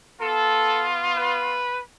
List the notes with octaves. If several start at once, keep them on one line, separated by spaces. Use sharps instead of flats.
B3 F4 A4
B4